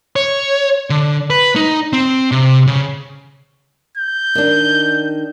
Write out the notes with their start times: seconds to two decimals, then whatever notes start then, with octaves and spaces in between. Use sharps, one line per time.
0.16 C#5
0.90 D3
1.30 B4
1.56 D#4
1.93 C4
2.32 C3
2.67 C#3
3.98 G6
4.35 D#3 D4